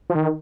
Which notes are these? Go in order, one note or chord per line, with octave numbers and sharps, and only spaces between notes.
F3
D#3